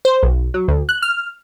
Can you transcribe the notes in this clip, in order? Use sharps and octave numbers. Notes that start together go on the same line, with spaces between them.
C5
B1
F#3
D2
F#6
F6